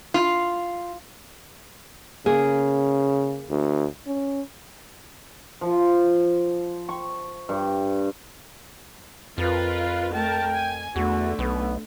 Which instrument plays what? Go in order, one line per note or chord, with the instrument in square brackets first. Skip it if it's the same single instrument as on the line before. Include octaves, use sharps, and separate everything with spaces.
[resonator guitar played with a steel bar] F4
[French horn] C#3 [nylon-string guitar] A#3 G#4
[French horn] D2
C#4
[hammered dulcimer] F3
C#6
G2
[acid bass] F2 [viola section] F4 A#4 B4
[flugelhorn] F5
[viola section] A3 A#4 A5 [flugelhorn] G5
[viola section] G#5
[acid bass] E2 [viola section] D3 A3 [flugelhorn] F#4
[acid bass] B1 [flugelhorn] B3